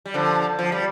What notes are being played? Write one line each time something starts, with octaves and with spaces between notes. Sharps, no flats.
G3
D3 F3
F3
G3